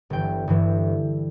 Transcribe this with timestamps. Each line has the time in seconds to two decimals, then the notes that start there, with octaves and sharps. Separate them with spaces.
0.10 G1 G2 E3 G5
0.47 G1 G2 E3